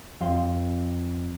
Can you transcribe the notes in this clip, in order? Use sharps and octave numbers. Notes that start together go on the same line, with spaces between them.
F2 F5 C6